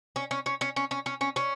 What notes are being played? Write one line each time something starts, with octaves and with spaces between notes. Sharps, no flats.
C#4
C#4
C#4
C#4
C#4
C#4
C#4
C#4
C#4